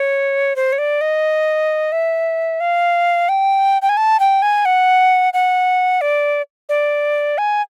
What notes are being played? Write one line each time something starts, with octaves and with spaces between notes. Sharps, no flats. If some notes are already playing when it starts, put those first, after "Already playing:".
Already playing: C#5
C5
C#5
D5
D#5
E5
F5
G5
G5
G#5
A5
G5
G#5
F#5
F#5
D5
D5
G#5